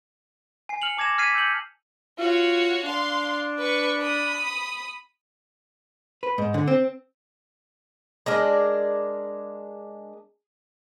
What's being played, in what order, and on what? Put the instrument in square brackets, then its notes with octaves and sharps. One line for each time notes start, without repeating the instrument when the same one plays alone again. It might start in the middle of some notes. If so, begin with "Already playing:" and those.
[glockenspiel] G#5 C7
F6 C#7 F7 F#7
A5 D6 G#6 A#6 E7
D6 F6 G#6 B6 C7 D#7
E6 G6 C#7 F#7
[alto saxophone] F4 [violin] F#4 C#5
[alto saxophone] D4 [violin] F5 C6
[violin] B4 C#6
B5 D#6
[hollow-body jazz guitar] B4
G#2
D3
C4
[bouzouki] G#3 D4 A#4